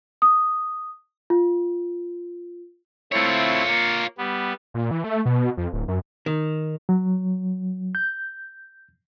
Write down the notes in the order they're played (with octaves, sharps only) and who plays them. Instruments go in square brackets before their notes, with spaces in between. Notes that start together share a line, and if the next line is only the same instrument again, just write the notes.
[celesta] D#6
F4
[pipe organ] A3 C4 E4 [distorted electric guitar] F4 C#5
[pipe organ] A#3
G3 B3
[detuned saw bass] A#2
E3
A3
B2
F2
D1
F#2
[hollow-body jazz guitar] D#3
[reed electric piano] F#3
G6